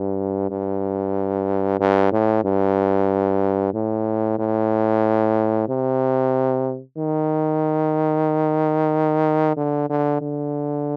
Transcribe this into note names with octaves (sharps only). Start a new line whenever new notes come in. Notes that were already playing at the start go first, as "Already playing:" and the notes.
Already playing: G2
G2
G2
A2
G2
A2
A2
C3
D#3
D3
D3
D3